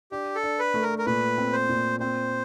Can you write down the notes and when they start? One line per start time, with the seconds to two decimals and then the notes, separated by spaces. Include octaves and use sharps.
0.12 D4 G4
0.36 A4
0.43 D4
0.59 B4
0.74 A3
0.82 A#4
0.98 A#4
1.06 A#2 B4
1.38 C4
1.53 C5
1.69 A#2
2.00 C4 C5